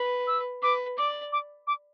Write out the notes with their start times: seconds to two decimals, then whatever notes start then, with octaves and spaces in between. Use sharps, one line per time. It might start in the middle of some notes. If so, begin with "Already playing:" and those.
Already playing: B4
0.27 E6
0.62 B4 D6
0.98 D5 D6
1.32 D6
1.67 D6